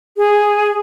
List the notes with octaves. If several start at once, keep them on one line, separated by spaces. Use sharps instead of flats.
G#4